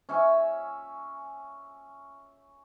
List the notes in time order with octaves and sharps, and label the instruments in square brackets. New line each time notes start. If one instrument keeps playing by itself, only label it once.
[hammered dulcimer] C#4 E5 G#5 C#6